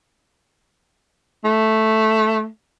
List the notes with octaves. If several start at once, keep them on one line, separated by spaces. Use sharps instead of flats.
A3